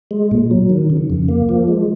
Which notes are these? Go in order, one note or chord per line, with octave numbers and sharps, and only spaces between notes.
G#3
A#2
F#3
D#3
C#3
F2
A#3
F3
G#3